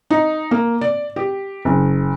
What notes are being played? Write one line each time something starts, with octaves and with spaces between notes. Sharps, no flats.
D#4
A#3
D5
G4
F#1